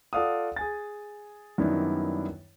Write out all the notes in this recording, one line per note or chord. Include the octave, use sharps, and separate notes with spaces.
F4 A4 D5 F5 F#5 D#6
G#4 G#5 A6
F#2 D#3 G3 B3 D4 E4